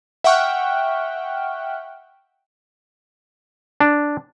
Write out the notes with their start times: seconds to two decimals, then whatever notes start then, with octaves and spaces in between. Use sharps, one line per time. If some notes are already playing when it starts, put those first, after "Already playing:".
0.24 E5 F#5 G5 C#6 F6 F#6
3.80 D4